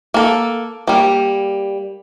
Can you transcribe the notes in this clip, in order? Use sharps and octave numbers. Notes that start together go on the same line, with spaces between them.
A#3 A4
G3 A#3